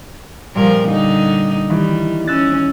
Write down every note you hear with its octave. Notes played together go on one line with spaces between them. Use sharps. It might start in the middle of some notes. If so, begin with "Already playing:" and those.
A#2 F3 G3 A#4
D3 D#4
D#3 E3 G3
C#4 E6 F#6 A6